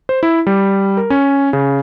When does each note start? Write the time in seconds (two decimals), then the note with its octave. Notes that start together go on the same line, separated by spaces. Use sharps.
0.09 C5
0.23 E4
0.47 G3
0.97 A#4
1.10 C#4
1.53 C#3